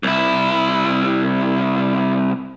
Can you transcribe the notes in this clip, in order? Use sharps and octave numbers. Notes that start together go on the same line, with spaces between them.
C2 E4